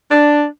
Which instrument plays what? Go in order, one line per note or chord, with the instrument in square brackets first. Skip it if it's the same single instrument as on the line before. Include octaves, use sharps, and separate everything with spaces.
[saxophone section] D4